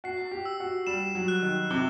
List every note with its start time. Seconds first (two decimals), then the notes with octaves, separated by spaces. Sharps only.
0.04 F#4 C7
0.31 G4
0.45 E6
0.60 F#4
0.87 G3 E7
1.15 F#3
1.28 F#6
1.42 D#3
1.70 C3 G7